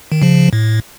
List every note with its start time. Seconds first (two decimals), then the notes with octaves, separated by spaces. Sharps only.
0.12 D#3
0.22 C#3 F3
0.53 A2